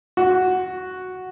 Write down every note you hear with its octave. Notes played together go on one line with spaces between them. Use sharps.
F#4